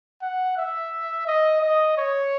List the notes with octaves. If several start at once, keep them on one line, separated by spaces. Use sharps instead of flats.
F#5
E5
D#5
D#5
C#5